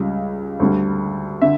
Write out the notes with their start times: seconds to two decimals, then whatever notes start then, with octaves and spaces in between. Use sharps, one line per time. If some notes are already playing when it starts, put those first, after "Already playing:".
Already playing: C#2 C#3 G3
0.60 D2 D3 G3
1.41 D3 E5